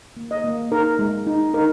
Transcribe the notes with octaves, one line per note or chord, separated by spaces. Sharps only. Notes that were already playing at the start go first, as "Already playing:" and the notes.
A#3
D#5
A#3
D#4 A#4
G#3
D#4
D#4 A#4